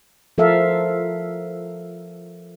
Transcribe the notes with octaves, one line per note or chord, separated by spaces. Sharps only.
F3 A4 A#4 E5 F5